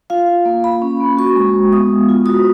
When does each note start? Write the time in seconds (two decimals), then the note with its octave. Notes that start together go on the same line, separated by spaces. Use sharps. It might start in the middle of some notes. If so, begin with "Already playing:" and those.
0.10 F4 F5
0.28 F4
0.45 A#3
0.64 A#3 B5
0.82 C#4
1.00 A#3
1.17 F#4 C#6
1.36 G#3
1.54 G#3
1.71 B3 D#6
1.90 B3
2.08 F4
2.26 F#4 D#6